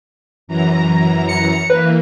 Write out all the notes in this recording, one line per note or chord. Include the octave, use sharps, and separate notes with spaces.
F#2 E3 A#5
C#7
E3 A#3 B4